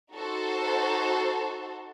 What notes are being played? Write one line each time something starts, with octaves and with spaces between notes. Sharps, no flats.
D#4 F#4 A4 C5